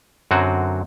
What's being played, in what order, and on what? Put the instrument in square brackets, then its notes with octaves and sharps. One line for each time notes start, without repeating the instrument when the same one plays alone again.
[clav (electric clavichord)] F#2 D3 F#3 C4 F#4